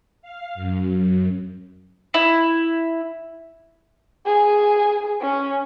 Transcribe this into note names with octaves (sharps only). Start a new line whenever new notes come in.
F5
F#2
F#2
E4
G#4
C#4